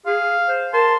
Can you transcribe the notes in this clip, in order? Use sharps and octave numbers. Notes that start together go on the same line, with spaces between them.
G#4 F5
C5
A#4 A5 C6